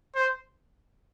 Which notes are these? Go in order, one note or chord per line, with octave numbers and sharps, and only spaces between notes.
C5